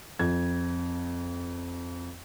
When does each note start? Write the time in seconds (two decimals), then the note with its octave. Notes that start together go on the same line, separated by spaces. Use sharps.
0.19 F2 G#6